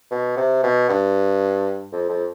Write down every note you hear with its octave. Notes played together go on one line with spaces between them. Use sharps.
B2
C3
B2
G2
F2
F2